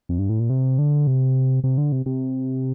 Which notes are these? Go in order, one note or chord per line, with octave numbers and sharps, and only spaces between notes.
F2
G2
A2
A#2
C3
D3
C3
C3
D3
C3
C3